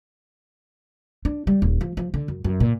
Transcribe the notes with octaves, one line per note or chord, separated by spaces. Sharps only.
D4
G3
D#1
F3
F3
D3
F#2
F#2
A#2